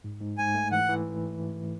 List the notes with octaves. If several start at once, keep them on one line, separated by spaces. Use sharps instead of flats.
G#2
G#2
G#2 G#5
A3
E3 F#5
E3